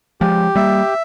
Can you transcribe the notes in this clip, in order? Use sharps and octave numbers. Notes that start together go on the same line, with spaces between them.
F3 G#3 G4
G3 A#3 E5